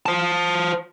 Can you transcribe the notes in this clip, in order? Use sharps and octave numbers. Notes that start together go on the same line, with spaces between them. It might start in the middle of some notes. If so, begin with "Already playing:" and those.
C5 A5